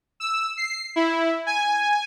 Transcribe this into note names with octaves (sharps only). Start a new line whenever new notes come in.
E6
C7
E4
G#5